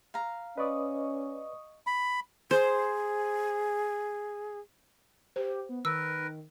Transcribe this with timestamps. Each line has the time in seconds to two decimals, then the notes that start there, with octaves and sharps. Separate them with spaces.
0.14 F5 A#5
0.58 C#4 B4 D5 D#5 C#6 D#6
1.87 B5
2.51 G#4 C5
5.36 G4 C5
5.69 B3
5.85 D#3 A#4 B4 E6